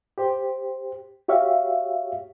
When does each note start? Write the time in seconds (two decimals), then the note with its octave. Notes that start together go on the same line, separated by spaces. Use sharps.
0.18 G4 C5
1.28 F#4 G4 C#5 E5 F5